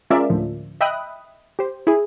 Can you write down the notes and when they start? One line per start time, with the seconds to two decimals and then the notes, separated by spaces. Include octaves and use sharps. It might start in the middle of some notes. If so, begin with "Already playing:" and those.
0.10 G#3 C#4 F4 A#4 D5 E5
0.30 D2 A2 F3
0.81 D#5 E5 G5 B5 D#6 F#6
1.59 G4 C5
1.87 E4 G#4